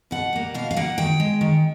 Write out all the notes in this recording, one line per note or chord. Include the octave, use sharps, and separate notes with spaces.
B2 F#5
G3 A#3
B2 F5
F5
G3 A#3 F#5
D#3 G5
G#3
D#3